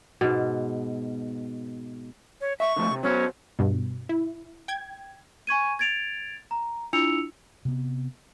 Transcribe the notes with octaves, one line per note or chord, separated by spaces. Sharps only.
G#2 B2
C#5
E5 C#6
D3 F3 A3
C3
F#3 B3 C#4 C5
G2 B2
E4
G5 G#6
G#5 C#6 G#6 D#7
G#6 A6 D7 F7
A#5
D4 E4 F4 E6 C#7 F7
C3 B3